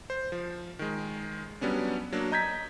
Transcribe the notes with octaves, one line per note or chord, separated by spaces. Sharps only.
C5
F3
D#3 G#3
F#3 G3 B3 C#4 D4
F#3 A#3 D4
D#5 A#5 G6 G#6 B6